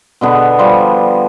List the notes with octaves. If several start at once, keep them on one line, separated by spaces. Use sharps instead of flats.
B2 D3 B3
F3 G3 F4